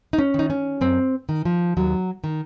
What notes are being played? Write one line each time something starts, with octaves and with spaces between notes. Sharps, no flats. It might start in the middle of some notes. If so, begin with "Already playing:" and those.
D#4
C#4
D#3 D#4
C#4
F#2 C4
D#3
F3
D#2 F#3
D#3